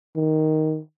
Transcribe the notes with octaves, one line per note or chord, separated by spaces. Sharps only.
D#3